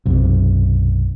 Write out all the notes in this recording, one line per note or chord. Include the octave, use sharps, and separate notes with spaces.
B1 F#2 C3